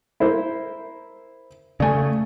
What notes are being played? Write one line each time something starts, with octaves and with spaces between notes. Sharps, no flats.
E4 A#4 C5
C#3 A3 D5 G#5